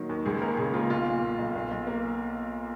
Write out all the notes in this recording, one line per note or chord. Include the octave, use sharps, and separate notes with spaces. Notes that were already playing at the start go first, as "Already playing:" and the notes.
Already playing: D#3 F#3 A#3
D#2
C#2 G#4
A#3 A#4
C#3 G#4
A#3 F4
B1 F4
A#2
A#2
B1
B1
B1
A#3